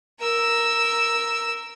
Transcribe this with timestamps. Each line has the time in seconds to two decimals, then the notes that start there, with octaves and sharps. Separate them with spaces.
0.20 A#4 E6